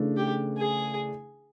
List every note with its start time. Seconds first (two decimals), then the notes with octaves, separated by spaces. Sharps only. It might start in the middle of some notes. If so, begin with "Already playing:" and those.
Already playing: C#3 E3 A3 D4
0.17 G4
0.59 G#4